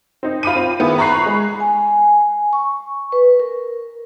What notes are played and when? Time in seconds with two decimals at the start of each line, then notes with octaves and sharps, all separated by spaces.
0.23 C4 D#4
0.43 F4 B5 D6 D#7
0.56 C4
0.79 D#3 B3 E4 G#4
0.98 A#5 B5 C#6 F#6 C7
1.26 G#3
1.60 G#5
2.53 C#6
3.12 B4
3.40 A#4